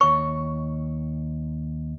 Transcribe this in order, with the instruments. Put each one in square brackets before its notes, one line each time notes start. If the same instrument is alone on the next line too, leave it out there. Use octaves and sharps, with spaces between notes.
[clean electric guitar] D#2 C#5 [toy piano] C#6